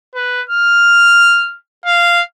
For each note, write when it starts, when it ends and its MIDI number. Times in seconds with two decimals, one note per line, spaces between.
0.14 0.41 71
0.49 1.57 89
1.86 2.21 77